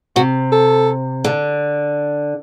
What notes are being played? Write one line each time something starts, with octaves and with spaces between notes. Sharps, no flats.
C3 F#4
A4
D3